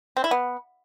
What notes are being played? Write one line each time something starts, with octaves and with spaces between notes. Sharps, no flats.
C4
E4
B3